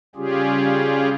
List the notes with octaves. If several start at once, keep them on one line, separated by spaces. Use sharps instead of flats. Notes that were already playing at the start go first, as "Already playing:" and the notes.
C#3 G3 C#4 F4 G4 G#4